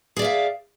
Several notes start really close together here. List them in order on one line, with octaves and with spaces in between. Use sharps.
G#4 D5 E5 F5